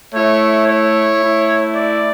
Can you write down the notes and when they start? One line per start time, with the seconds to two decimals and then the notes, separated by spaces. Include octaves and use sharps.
0.13 A3 E4 C#5
0.67 C#5
1.20 A3
1.25 E4
1.74 D5